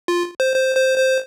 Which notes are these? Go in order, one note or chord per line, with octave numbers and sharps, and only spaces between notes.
F4
C5
C5
C5
C5